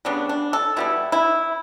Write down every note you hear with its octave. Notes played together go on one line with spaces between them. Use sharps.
C#3 G3 B3 D4
D4
A4
B2 G3 B3 E4
E4